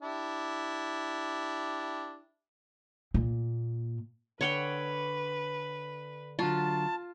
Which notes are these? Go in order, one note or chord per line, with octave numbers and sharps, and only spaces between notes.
D4 E4 G4
A#2
D3 B4 C#5 F#5 G5
D3 F#3 F4 A5